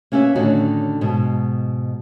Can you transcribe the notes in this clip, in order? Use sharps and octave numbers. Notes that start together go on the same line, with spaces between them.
A#3 C#4 B4 D#5 E5
A2 D3 D#3 C#4 D#4 F#4
G#2 B2